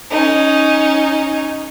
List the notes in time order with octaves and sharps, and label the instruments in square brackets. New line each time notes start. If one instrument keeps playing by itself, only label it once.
[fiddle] C#4 D#4